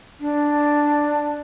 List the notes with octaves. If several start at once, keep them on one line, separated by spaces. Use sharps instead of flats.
D4